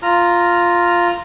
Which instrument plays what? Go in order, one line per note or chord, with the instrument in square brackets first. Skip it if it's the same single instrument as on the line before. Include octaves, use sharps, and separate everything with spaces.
[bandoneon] F4 A#5 F6